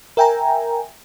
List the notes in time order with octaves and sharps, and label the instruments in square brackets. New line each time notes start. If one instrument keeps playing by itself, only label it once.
[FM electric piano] A#4 E5 G5 G#5 A#5